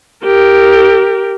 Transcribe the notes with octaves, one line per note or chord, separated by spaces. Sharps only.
G4 A#4